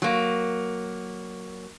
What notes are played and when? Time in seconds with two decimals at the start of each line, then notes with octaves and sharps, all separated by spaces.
0.02 F#3 A#3